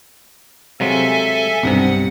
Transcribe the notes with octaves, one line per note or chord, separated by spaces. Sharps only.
C3 F#3 G#3 A4 E5 F5 G#5
B1 G2 C3 C4 F#5